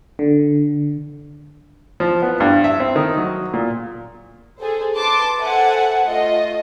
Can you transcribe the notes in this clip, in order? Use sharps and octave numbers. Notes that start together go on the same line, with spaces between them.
D3
F3
B3
G2
E5
C4
D#3
F#3
A#2
G#4 A4 C5
B4 A5 C6 D6
A4 C5 E5 F#5 G#5 A5
A3 F4 D#5